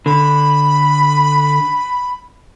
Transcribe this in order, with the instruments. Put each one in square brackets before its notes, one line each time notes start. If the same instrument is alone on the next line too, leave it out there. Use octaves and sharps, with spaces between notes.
[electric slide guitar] D3 [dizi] B5